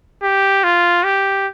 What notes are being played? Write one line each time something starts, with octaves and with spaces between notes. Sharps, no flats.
G4
F4
G4